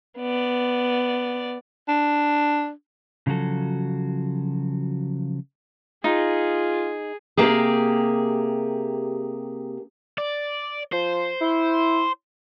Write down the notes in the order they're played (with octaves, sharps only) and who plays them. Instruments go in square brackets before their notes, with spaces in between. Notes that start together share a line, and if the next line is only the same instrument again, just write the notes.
[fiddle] B3 D5
[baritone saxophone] D4
[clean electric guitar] C#3 F3 F#3 F#4 A4
[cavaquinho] D#4 [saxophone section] F4 [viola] G#4
[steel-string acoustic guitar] C3 A#3 G4 G#4
[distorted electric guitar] D5
[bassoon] F3 [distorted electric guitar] C5
[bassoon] E4